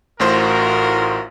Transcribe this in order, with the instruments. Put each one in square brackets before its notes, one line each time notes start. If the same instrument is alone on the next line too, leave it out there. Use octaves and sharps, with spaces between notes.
[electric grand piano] A1 A2 C5 [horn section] F4 F#4 A#4